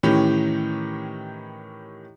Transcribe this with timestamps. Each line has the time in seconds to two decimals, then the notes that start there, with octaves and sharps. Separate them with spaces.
0.03 A2 D#3 E3 C#4 G4